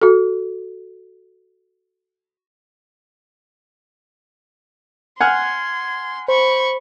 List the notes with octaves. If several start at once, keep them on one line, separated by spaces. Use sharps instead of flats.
F#4 A4
F#5 G#5 C6 F6 G#6
C5 B5 C#6